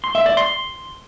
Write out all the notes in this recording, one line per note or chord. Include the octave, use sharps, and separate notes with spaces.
C6
E5
D5
C6